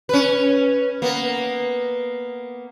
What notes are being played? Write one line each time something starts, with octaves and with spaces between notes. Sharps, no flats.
C#4 B4
A#3 B3